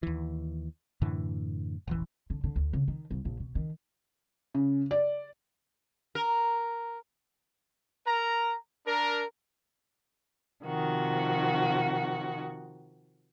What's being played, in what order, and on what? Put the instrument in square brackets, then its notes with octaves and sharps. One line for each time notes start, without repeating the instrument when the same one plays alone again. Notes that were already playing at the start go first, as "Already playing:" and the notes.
[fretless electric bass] D#2 E3
F#2 A2 D3 E3
E1 A1 E3
[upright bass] D3
D3
D2
C#3
D#3
C2
A#1
B2
D#3
[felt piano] C#3
D5
[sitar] A#4
[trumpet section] A#4 A#5
D4 A#4
[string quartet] C3 D#3 F3 F#4